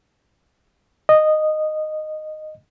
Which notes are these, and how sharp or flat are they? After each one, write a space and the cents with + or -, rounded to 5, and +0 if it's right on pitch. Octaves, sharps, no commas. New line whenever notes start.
D#5 -10